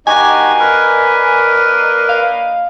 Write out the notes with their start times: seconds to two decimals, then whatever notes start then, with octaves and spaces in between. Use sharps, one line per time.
0.07 A#3 D4 D#4 F#4 G4 D#5 G#5
0.59 A#4 B4
2.09 F5